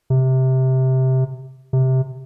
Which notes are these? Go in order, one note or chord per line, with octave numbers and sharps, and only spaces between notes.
C3
C3